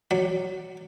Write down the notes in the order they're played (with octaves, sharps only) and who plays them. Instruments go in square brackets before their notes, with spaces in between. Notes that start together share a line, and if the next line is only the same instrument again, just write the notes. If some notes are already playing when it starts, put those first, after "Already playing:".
[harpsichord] F#3 D5